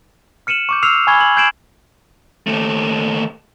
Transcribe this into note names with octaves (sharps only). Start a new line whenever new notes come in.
F6 C#7 D#7 E7 F#7
C#6 D6 G6
E6 F6 C7 F7
G#5 B5 C#6 G#6 C7 G7
F#7
G6 G#6 C7 D7 E7 F#7
D#2 A3